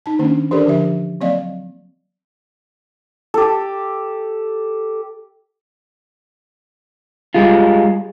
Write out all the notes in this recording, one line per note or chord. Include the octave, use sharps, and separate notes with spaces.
D#4 A5
D#3 A#3 C#4 D4
E3 D4 G4 A4 A#4 D5
D3 F3 G4 E5
F#3 A#3 C4 D5 D#5 F5
G4 A4
G3 G#3 F4